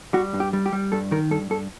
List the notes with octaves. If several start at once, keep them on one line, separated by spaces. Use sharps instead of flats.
G3 F#4
G2
G4
G3
G4
G3
G2 A4
D#3 A#4
G2 A4
G2 A4